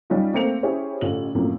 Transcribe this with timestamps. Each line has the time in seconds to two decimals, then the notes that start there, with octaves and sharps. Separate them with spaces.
0.10 G3 C#4 D#4 F4
0.33 A3 A#3 C4 C#7 F7
0.63 C#4 E4 G4 G#4 C5 C#5
1.01 A1 D3 F4 F#7
1.35 F#2 A2 C3 E3 F3 A#3